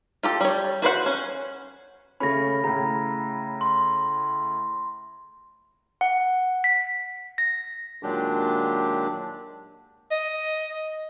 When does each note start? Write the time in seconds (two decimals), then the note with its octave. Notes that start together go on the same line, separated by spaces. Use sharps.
0.23 F4 G4 A4
0.41 G3 C#5
0.82 F#4 B4 C5 F#5
1.06 C#4
2.20 C#3 A3 C#4 B5 A#6
2.64 A2 C#3 A#5
3.61 C6
6.01 F#5
6.64 B6
7.38 A#6
8.03 A#2 D#3 F#3 G#3 D4 G4
10.11 D#5